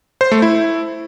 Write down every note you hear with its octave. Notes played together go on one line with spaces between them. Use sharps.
C5
A3
E4